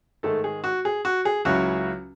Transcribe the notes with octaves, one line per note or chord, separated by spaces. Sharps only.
G#2 D#3 G#3 A3 A4
G#4
F#4
G#4
F#4
G#4
C#2 C#3 F#3 C#4 E4 F#4